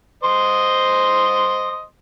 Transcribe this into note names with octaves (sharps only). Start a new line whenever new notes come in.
C5 D#5 C6